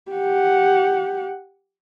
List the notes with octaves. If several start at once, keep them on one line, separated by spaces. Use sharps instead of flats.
G4 F#5